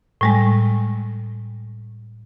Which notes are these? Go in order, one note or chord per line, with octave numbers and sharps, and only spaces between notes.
A2 G3 G#3